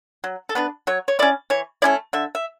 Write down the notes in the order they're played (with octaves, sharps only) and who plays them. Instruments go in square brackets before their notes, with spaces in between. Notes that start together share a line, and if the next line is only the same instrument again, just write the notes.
[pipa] F#3
A4
B3 D4 B4
F#3 C#5
C#5
C#4 E4 D5
E3 C#5
A3 C#4 E4 D5
D3 E5
E5